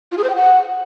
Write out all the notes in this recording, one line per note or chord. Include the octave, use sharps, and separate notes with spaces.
F4
G#4
C5
G5
F#5